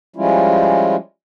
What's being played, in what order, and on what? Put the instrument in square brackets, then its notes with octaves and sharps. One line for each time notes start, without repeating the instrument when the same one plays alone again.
[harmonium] F3 G3 G#3 C#4 E4 F4